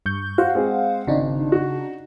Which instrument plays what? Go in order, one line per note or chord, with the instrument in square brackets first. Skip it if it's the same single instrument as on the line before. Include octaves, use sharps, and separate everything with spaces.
[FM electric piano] G2 C#6 G6
[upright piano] F#4 [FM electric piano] C5 F5 F#5
[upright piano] G#3 C4
[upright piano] G#1 [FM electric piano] C#3 D4 D#4
[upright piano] F#4